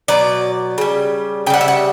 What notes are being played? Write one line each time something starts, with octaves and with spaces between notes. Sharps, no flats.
B2 F#3 D5
C#3 G3
C#3 G3 F#5 G5
E5
F#5